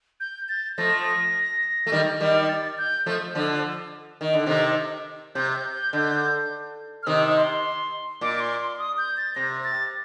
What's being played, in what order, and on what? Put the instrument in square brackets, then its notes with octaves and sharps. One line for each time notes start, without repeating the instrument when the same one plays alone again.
[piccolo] G6
A6
[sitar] F3 A3 [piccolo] A#6
[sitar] A3
D#3 G3
D#3 G3
[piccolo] A6
G6
[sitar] F3 A3
D3 F3
D#3
D3
C3 D#3
[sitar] C3 [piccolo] G6
[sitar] D3
[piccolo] F6
[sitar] C3 D#3 [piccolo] D#6
[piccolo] C6
[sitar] A#2 [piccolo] D6
[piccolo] D6
C6
C6
D#6
G6
A6
[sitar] C3 [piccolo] A#6
[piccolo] A6